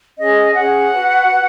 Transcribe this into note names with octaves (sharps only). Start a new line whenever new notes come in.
C#4 G#4 C#5 D#5
C#4 G#4 C#5 F#5
F#4 B4
F#4 B4